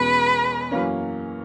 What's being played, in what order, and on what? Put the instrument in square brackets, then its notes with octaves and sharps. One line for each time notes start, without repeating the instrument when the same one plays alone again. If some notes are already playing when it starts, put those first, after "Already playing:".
Already playing: [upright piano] E2 B2 G#3 C#4 [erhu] B4
[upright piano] F#2 E3 A#3 C#4